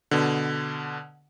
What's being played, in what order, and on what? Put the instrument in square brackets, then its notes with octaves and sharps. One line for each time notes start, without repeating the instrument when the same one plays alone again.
[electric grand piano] B2 D3